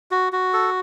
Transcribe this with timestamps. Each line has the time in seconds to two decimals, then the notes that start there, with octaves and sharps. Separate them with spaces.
0.11 F#4
0.33 F#4
0.53 A4